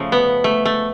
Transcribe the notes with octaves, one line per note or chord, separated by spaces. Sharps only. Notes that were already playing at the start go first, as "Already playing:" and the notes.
Already playing: C#3 F3 A3
B3
A3
A3